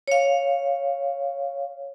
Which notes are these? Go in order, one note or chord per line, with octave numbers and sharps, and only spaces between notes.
C#5 F5